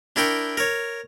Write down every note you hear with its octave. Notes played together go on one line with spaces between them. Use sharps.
D4 E4 A#4 G5 C#6
A#4 C#5